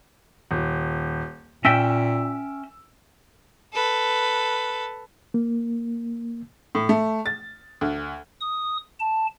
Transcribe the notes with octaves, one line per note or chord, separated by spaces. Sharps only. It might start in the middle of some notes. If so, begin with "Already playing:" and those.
D#1
A#2 C#4 E5 G5 E6
A4 B4
A#3
A2
A3
A6
D2
D#6
A5